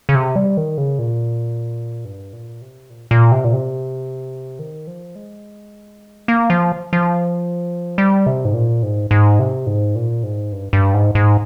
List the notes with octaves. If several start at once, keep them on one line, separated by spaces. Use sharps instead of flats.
C#3
C3
G3
D#3
C#3
A#2
G2
A#2
C3
A#2
A#2
C3
A#2
C3
D#3
F3
G#3
A#3
F3
F3
G3
C3
G#2
A#2
G#2
G#2
C3
G#2
A#2
G#2
G2
G2
G#2
G#2